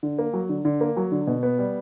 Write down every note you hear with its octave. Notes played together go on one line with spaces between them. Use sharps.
D3
A#3
F#3
D3
D3
A#3
F#3
D3
B2
B3
G3